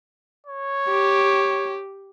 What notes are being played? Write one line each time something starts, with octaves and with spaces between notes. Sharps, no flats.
C#5
G4